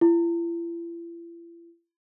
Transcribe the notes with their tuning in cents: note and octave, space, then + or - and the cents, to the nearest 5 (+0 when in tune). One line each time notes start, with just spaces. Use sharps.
E4 +45